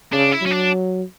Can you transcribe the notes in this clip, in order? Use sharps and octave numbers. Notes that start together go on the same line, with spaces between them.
C#3 D4
E4
F#3 C#4
D4